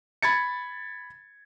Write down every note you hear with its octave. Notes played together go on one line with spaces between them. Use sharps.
B5 G#6 A6 C#7